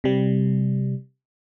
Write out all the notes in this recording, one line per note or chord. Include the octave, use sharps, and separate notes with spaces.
C3 G3